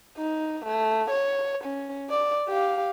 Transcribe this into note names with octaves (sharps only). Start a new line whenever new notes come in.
D#4
A3
C#5
C#4
D5
G4 F5